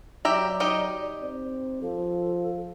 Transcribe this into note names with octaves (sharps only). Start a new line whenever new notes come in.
F#3 G4 D5 E5 A#5
D#4 G4 D#5
C4
F3 A4